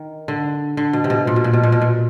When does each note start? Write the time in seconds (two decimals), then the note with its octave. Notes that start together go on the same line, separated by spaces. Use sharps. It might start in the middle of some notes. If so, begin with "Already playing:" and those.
Already playing: D#3
0.28 D3
0.77 D3
0.93 B2
1.04 C3
1.10 B2
1.27 A#2
1.36 B2
1.44 A#2
1.54 B2
1.63 A#2
1.72 B2
1.82 A#2